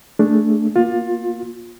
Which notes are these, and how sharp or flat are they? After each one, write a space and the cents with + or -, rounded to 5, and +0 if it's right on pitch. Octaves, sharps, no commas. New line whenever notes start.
A3 +0 D4 +0 G#4 +0
A#3 +30 F4 +20